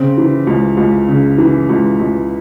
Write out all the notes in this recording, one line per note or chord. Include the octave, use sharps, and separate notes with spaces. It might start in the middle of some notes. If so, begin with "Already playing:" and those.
Already playing: C#3 C4
E3
C#2
C#2
C#3
E3
C#2
C#2